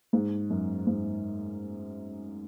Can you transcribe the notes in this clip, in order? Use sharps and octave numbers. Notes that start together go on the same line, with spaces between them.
G#2
F#2
G#2